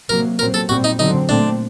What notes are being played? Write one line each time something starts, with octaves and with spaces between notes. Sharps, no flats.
C3 F#3 A#3 A#4
A#2 F#3 C4 A#4
A4
A#2 G3 C4 F#4
D#4
D3 F#3 C4 D#4
A#2 A3 C4 D4